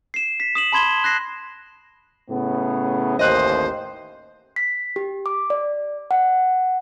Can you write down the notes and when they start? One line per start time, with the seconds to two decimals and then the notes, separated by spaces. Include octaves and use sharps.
0.14 C7 E7
0.40 B6
0.55 D#6 E7 F#7
0.72 A5 B5 C6 G#6 E7 G7
1.04 F#6 A#6 C7
2.30 A2 C#3 B3
3.19 A1 D#2 C5 D#5 F#6 D#7
4.56 B6
4.96 G4
5.26 D6
5.50 D5
6.11 F#5